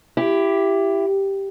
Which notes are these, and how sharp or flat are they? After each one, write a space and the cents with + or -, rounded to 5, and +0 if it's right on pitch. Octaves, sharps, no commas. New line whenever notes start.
E4 +20 G4 +0